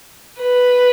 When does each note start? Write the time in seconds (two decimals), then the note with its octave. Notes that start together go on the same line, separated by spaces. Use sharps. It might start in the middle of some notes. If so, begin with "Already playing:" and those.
0.40 B4